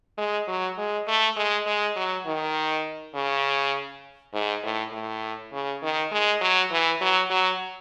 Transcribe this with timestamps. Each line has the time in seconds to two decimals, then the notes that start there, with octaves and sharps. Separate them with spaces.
0.18 G#3
0.48 F#3
0.78 G#3
1.08 A3
1.36 G#3
1.66 G#3
1.96 F#3
2.26 D#3
3.14 C#3
4.33 G#2
4.63 A2
4.92 A2
5.52 C#3
5.82 D#3
6.12 G#3
6.41 F#3
6.71 E3
7.01 F#3
7.30 F#3